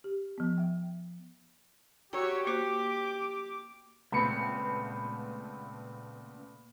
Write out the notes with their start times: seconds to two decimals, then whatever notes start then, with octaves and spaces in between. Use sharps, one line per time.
0.04 G4
0.38 F3 B3
0.58 E5 G5
2.13 F#4 G4 C#5 G5 A#5 E6
2.47 A#3 F#4 C5 D6
4.12 C#2 A#2 A3 B3 C4 B5 C#7